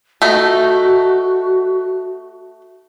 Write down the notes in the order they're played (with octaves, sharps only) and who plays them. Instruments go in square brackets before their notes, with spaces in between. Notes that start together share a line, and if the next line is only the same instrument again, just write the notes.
[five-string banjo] A3 D#4 [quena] F#4